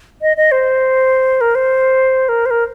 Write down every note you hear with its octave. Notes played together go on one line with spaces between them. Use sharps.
D#5
D#5
C5
A#4
C5
A#4
C5
A#4